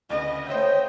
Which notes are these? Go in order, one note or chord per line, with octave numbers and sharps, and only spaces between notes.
D2 C#3 B4 D#5
A3 C5 C#5 D#5 E5 G5